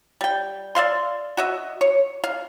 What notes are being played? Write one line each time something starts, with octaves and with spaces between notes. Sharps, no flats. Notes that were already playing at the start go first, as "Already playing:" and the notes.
G3 G5
D5 E5 F5 C6
F#4 D#5 E5
C#5
F5